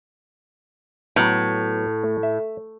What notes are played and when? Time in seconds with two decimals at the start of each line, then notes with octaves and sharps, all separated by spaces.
1.16 A2 F#3 B3
2.04 A3
2.23 E5